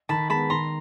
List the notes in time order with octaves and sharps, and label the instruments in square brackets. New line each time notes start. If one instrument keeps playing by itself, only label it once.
[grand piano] D#3 [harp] A5 B5
[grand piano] G#3 B3 [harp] A5 B5
[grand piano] D#3 [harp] A#5 C6